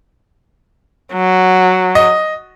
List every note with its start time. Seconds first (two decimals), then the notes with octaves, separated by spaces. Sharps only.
1.14 F#3
1.95 D#5